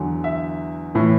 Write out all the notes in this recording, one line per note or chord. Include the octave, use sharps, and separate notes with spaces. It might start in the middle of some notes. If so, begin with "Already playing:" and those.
Already playing: E2 D3 F#3
E5
A2 E3